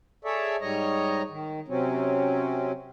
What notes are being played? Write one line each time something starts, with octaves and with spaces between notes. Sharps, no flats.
G#4 A4 C#5 D5 E5
G#2 G3 C#5 D#5 A#5
D#3
C3 F#3 C4 C#4